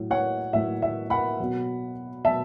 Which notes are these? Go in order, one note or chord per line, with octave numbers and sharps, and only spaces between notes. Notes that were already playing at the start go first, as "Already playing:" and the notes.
Already playing: A2 F#3
C#5 F#5
A2 F#3 E5
E5
F#5 B5
B2 F#3
B2 F#3 E5 A5